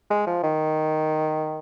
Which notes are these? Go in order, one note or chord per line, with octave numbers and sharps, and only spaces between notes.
G#3
F3
D#3